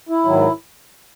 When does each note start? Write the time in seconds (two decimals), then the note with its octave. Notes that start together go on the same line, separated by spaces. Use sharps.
0.09 E4
0.25 G#2 D#3 F#3